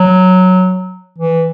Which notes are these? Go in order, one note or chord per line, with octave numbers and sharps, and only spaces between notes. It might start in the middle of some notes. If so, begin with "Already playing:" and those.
Already playing: F#3
E3